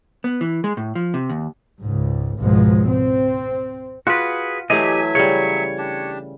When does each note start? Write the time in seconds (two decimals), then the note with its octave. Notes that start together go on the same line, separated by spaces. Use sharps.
0.24 B3
0.41 E3
0.64 G#3
0.77 A2
0.95 F3
1.14 C3
1.29 D#2
1.82 C#2 G#2
2.39 G#1 C#2 G#2 B2 F3 G#3
2.88 C4
4.07 F4 F#4 G#4 B4
4.70 E3 F#3 A3 G4 G#4 D#5 E5 G#5
5.15 C#3 G3 C#5
5.78 D4 G4 A5